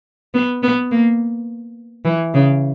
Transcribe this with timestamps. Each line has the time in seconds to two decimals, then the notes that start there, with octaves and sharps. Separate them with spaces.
0.34 B3
0.63 B3
0.91 A#3
2.05 E3
2.34 C#3